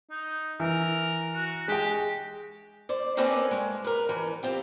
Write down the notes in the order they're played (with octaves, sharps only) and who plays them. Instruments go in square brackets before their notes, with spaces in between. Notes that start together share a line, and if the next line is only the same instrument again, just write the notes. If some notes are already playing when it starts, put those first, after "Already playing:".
[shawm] D#4
[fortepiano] E3 [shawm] A#4
[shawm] F#4
[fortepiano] G#3 G5 [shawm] G4
[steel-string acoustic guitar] C5 D5
A#3 C4 C#4 A4 B4 D5
G#3
A#4 B4
E3 F3
C4 F4 G4